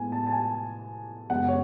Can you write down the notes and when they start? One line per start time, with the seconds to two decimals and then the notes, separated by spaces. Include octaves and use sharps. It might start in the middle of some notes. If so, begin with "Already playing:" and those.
Already playing: A2 G#3 B3 G#5
0.12 A5
0.27 A5
0.32 G#5
1.30 F#2 C#3 G#3 B3 F#5
1.48 C#5